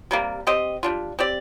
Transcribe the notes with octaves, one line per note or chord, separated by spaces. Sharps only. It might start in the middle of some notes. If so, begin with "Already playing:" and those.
C3 G3 A#3
C4 G4 C5 D#5
G3 D4 F4
C4 G4 D5